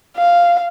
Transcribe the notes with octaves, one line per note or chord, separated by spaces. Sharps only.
F5